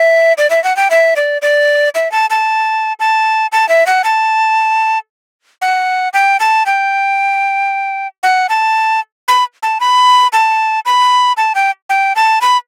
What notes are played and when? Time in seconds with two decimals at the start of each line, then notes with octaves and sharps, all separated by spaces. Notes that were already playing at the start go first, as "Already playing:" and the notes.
Already playing: E5
0.38 D5
0.50 E5
0.64 F#5
0.77 G5
0.91 E5
1.16 D5
1.42 D5
1.95 E5
2.12 A5
2.30 A5
3.00 A5
3.52 A5
3.69 E5
3.87 F#5
4.04 A5
5.62 F#5
6.13 G5
6.40 A5
6.66 G5
8.23 F#5
8.49 A5
9.28 B5
9.63 A5
9.80 B5
10.33 A5
10.86 B5
11.37 A5
11.55 G5
11.89 G5
12.16 A5
12.41 B5